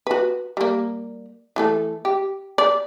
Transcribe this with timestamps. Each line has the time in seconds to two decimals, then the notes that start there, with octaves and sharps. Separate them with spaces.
0.07 F#4 B4
0.57 G3 A#3
1.56 E3 A3 A4
2.05 G4
2.58 D5